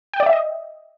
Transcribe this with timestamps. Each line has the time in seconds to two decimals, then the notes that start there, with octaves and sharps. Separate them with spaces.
0.14 G5
0.20 D5
0.26 E5
0.33 D#5